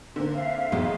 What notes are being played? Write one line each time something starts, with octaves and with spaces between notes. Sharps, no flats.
D3 A#3 C4
E5 F5
B1 E2 G#3